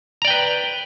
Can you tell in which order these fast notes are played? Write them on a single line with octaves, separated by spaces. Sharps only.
A#5 D5 G5 B4